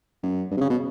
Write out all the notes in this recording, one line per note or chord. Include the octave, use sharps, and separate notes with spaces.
F#2
G2
C3
C#3
B2